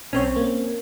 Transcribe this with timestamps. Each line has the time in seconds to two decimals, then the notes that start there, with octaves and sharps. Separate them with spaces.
0.13 B1 C4 C#4 C#5
0.36 A#3